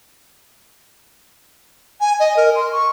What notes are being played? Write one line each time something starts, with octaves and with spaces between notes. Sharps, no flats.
G#5
D#5
A#4
C6
C#6